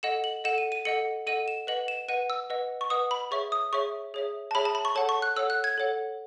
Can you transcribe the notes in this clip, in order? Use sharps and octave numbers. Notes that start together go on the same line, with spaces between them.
A4 D#5 F#5 E7
F#7
A4 D#5 F#5 E7
D#7
D#7
A4 D#5 F#5 C#7
A4 D#5 F#5 D#7
E7
B4 D#5 F#5 F#7
E7
B4 D#5 F#5 D#7
E6
B4 D#5 F#5
C#6
B4 D#5 F#5 D#6
B5
G#4 C#5 E5 C#6
D#6
G#4 C#5 E5 C#6
G#4 C#5 E5
A5
G#4 C#5 E5 B5
A5
B5
C#6
A4 C#5 F#5 A5
C#6
F#6
A4 C#5 F#5 E6
F#6
G#6
A4 C#5 F#5